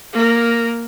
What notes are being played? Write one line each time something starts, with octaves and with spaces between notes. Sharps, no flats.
A#3 A#4